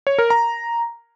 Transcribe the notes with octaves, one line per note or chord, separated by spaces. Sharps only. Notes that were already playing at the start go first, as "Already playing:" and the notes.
C#5
A#4
A#5